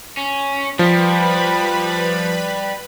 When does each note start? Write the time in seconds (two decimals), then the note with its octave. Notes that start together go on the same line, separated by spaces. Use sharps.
0.17 C#4
0.79 F3 G3 B4 B5